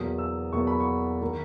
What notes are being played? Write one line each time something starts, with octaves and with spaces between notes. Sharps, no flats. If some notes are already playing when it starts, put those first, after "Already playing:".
Already playing: E2 B2 F#3 A#3 D#6
E6
E2 B2 F#3 A#3 C#6
B5
C#6
D#3 A#3